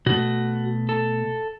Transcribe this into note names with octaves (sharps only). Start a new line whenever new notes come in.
B2 A3 F#4
A4